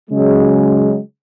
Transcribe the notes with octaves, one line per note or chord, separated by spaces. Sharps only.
C#3 F#3 G#3